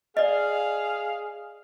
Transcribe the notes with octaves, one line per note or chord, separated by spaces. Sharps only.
G#4 D5 D#5 F5